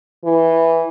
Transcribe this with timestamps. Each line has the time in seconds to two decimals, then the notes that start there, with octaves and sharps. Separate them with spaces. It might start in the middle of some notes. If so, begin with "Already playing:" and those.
0.24 E3